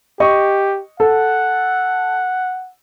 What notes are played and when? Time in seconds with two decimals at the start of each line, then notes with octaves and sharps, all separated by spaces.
0.20 G4 D#5 C#6
1.00 A4 F#5